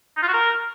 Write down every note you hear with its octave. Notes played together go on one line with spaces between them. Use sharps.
D#4
F4
F#4
A#4